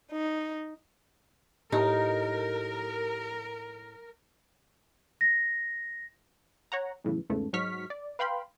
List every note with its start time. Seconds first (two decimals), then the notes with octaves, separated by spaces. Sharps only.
0.12 D#4
1.72 A2 D#4 G4 A#4
5.21 A#6
6.72 C#5 F#5 A#5
7.04 B1 A2 C#3 E3
7.30 E2 G#2 C#3 A3
7.53 G#2 F#3 D#4 C#6 F6 B6
7.90 D5
8.19 B4 F5 G5 B5 C6